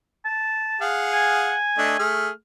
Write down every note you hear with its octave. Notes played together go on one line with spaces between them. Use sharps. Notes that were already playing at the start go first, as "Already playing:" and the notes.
A5
G#4 F5 F#5
G#5
A3 D4 D#5
A3 G#4 F6